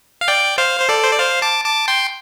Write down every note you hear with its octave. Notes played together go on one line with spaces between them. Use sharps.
F5
D5 G5
C5 F5
C5
A4 D5
C5
D5
C5 F5
A5 D6
A5 D6
G5 C6